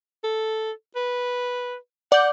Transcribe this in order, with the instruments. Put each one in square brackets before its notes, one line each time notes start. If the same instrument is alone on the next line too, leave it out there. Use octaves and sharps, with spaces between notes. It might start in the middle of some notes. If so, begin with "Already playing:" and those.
[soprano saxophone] A4
B4
[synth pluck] D5 G6 [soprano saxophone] F#5